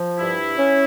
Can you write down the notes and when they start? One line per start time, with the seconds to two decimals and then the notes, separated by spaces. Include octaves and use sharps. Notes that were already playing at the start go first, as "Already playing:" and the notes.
Already playing: F3
0.19 G2 E4
0.58 C#4